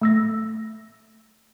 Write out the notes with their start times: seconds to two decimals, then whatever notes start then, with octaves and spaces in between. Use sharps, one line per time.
0.01 A3 E6 A#6